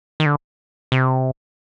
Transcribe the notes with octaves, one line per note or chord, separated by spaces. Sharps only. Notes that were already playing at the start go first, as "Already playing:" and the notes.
D#3
D3
C3